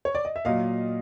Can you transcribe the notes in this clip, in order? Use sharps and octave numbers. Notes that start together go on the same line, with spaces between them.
C#5
D5
D#5
E5
A#2 F#3 D#5 F5